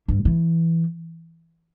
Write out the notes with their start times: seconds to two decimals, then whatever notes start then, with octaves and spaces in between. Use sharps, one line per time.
0.08 G2
0.25 E3